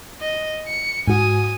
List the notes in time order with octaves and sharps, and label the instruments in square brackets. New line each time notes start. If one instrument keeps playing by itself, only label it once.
[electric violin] D#5
C#7
[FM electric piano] G#2 F#4 [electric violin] G#5 D#6